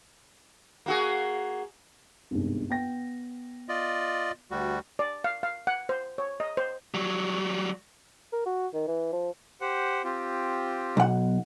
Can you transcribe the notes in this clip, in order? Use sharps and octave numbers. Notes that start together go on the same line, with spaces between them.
A#3 F#4 G#4
G1 C2 G#2
B3 G5 A#6
F4 D5 D#5
D2 G3 F#4
D5
F5
F5
F#5
C5
C#5
D#5
C5
F#3 G3
A#4
F#4
D#3
E3
F3
G4 C5 F#5
C4 F4 G4
B1 F#5